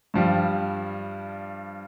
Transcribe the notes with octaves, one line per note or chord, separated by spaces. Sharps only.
G2 F3 G3